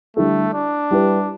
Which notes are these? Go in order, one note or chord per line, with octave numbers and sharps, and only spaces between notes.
D3 G3 A3 E4 A4
D4
G3 E4 G4 B4